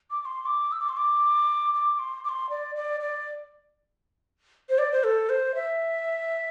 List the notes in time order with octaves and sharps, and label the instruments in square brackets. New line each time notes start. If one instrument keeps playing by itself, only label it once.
[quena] D6
D6
C6
D6
E6
D6
C6
D6
D6
C6
D6
C6
D5
D5
D5
C5
D5
C5
A4
C5
E5